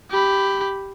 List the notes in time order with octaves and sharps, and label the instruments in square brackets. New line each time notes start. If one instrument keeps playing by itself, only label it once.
[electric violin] G4 B5